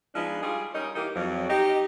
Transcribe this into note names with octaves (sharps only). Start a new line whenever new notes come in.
F3 G#3 B3 D4 D#4
G3 F4 G#4
G3 C#4 D#4 A#4 D#5
E3 A#3 D#4 G4 A#4
F2 F#3
D#4 G4